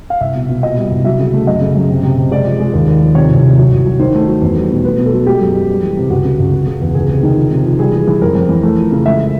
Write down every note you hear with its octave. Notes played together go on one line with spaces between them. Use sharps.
F5
C2 E5
B2
B2
A#2 D#5
G3
C2
F#3 E5
C#3
A3
F#2 D#5
C#3
F#2
C3
C3
C3
G#3 D5
F3
G#3
D#2
D#2
F3
C3 C#5
C2
C2
F#3
C2
F#3
D#3 C5
A3
F#3
E2
G3
B2
A3 B4
B2
A4
F#3
G#3 G4
F#2
G#3
G3
E3
C3
C#2 F#4
C#3
C#2
C#3
C#3
E2
C#2 G#4
C3
D#3
F3
C3
F3
G3 G#4
E3
E3
F2 A#4
F2
E3
A3
F3
C#3
G#3 E5